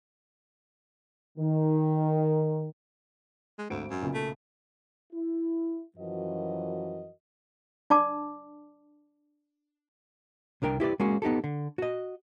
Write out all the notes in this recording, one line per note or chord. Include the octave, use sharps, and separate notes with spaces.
D#3
G#3
G#1 D2 F#4 D7
F#2
B1 A#2 C#3
A3
E4
F#2 E3 F3 F#4 A#4 D#5
D4 D5 A5 D6
C2 D4 A#4 G5
E4 G4 B4 D5
G#3 A#3 C#4 F#4
B3 D#4 G4 A4
D3
F#4 D#5